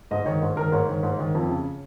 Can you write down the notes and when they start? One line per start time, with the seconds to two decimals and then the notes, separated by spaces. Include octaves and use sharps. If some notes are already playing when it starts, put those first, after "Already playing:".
0.11 G#2 D#5
0.26 D#3 C#5
0.42 G#2
0.57 D#3 A#4
0.72 G#2 C#5
0.88 D#3
1.03 G#2
1.19 D#3
1.35 F2
1.49 C#3